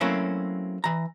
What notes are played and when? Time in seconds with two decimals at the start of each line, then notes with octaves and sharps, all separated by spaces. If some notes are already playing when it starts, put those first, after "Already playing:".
0.01 F#3 A3 A#3 C4 C#4 E4
0.84 E3 A#5